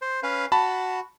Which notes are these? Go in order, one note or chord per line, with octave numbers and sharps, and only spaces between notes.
C5
C#4 B4 F5
F#4 A5 B5